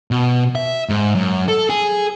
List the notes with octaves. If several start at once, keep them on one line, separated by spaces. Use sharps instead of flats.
B2
E5
G#2
F#2
A4
G#4